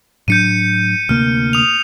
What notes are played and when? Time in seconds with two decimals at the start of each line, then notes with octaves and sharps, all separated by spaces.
0.28 A2 F#3 D4 G6 C#7 D#7
1.09 D2 C3 A#3 F6
1.53 D#6 F7